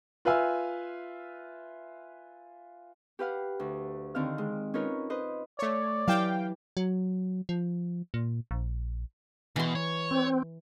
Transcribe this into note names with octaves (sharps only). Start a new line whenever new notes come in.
F4 B4 E5 F5 G#5 E6
G4 B4 F5 F#5
D2
D3 D#3 C4 F5 F6
G#3
C#4 D#4 F4 A#4 B4 C#5
B4 C5 D#5
A3 C#5 D5
E3 F#3 G4 F5 G5 A5
F#3
F3
A#2
A#1
B2 E3 C6
C#5
C4